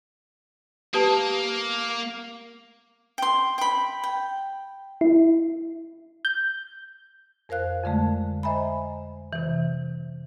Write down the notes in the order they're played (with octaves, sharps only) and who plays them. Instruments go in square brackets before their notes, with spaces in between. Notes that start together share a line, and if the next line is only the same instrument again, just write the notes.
[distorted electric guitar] A#3 [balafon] G4 B4 A5
[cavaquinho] G5 C6
G5 B5
G5
[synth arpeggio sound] E4
G6
[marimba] F2 A#4 C5 F5 F#6
F2 D3 G#3 A3
C5 D#5 E5 G#5 A#5 B5
C3 E3